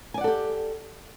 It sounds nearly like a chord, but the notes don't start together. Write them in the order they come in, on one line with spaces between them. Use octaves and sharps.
G#5 D5 F#5 A4 G4